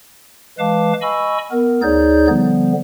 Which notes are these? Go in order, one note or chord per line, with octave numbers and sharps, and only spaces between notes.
E3 G#3 B4 F5 A5 D6
D#5 G#5 B5 C#6 E6
B3 A#4
D2 D#4 G#4 C#5 D5 G6
D3 F3 G3 B3